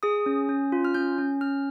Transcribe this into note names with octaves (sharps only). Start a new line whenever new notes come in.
G#4 D#6
C#4
C#4
F4
F6
C#4 G6
C#4
C#4 F6